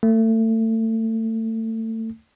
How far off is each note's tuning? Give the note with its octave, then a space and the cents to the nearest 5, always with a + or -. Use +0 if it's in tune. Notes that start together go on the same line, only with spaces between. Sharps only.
A3 +30